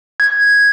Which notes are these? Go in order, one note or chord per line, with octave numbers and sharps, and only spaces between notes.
G#6